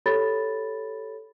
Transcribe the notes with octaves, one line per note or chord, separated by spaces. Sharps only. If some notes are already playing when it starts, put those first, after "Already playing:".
G4 A4 C#5 B5 A6